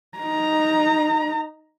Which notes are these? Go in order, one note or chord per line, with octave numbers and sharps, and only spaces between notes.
D#4 A#5